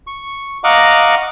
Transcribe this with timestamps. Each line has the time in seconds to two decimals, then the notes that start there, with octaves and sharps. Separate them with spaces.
0.07 C#6
0.64 D#5 F5 F#5 A#5 C#6 D6